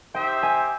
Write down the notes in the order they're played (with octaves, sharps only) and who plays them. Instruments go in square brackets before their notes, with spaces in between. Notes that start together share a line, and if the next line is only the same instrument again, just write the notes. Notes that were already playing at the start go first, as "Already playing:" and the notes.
[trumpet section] D#4 G4 C5 E5 [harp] G5
[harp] G#5